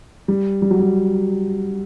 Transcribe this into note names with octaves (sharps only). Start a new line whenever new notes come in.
G3
G3
F#3
G3